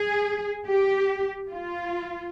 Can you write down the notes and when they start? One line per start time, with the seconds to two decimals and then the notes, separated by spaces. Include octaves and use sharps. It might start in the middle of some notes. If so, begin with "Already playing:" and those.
Already playing: G#4
0.68 G4
1.51 F4